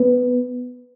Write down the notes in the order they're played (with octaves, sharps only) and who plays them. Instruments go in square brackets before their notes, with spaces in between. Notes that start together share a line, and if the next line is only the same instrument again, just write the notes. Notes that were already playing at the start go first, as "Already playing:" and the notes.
Already playing: [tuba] B3